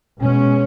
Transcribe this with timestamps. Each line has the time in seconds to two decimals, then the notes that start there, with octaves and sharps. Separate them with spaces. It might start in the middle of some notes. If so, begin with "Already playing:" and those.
0.19 B2 G#3 C#4